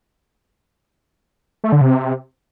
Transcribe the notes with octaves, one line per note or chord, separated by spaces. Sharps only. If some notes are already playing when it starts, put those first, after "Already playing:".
A3
D3
C3